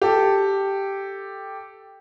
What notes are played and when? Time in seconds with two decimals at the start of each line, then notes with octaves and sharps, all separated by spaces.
0.02 G4 A4